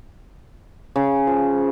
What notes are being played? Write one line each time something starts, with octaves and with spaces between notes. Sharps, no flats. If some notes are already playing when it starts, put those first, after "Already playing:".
C#3
F3